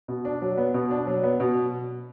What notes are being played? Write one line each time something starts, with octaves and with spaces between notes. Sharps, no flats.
B2
D4
F#3
B3
B2
D4
F#3
B3
B2